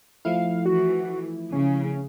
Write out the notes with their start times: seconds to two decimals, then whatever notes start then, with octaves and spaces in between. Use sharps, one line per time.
0.25 F3 A3 E4 F5
0.66 E3 F#4
1.52 C#3 C#4